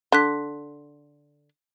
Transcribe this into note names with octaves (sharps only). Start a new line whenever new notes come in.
D3 C6 F#6 B6